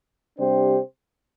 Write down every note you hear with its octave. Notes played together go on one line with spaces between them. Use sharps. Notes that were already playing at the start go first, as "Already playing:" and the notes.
C3 G3 D4 G4 C5